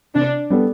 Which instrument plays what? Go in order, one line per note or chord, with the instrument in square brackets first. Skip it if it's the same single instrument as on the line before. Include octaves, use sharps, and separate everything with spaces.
[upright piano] C3 [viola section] D4
[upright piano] G3 B3 D4 A4